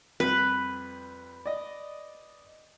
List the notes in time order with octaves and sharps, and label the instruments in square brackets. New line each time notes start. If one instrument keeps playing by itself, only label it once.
[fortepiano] F2 G3 [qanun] B4
[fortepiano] D5 D#5